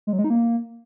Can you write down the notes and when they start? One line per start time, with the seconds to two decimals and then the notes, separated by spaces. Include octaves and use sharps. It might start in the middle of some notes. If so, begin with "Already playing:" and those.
0.07 G#3
0.13 F#3
0.19 G#3
0.24 D#4
0.30 A#3